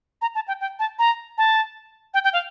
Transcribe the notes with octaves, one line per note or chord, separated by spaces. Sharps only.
A#5
A5
G5
G5
A5
A#5
A5
G5
G5
F5